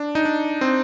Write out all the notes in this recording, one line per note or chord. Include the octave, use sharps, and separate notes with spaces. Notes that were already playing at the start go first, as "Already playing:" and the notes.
Already playing: D4
D#4
D4
C4